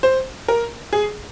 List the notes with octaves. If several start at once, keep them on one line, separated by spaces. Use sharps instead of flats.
C5
A#4
G#4